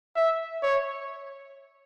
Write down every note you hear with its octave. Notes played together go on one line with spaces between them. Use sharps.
E5
C#5